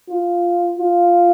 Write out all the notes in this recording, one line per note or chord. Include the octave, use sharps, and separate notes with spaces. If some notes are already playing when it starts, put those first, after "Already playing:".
F4
F4